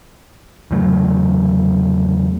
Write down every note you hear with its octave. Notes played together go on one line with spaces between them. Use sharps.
E2 C#3 F#3 A3